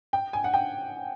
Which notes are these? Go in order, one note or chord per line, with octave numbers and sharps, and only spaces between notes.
G5
G#5
F#5
G5